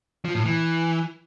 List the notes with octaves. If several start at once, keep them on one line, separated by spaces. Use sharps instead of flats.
F3
A2
E3